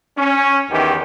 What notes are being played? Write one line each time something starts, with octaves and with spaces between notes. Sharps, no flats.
C#4
E2 D#3 E3 G4